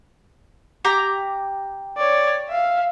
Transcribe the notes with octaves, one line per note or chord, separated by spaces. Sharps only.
G4 A#5 D6
C#5 D5
E5 F5